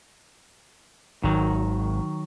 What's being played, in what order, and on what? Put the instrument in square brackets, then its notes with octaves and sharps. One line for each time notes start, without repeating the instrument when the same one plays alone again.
[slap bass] G#1 [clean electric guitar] D#3 F#3